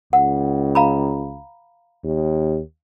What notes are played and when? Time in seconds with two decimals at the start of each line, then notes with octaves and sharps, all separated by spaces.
0.13 C#2 F#5
0.75 F5 A#5 B5
2.04 D#2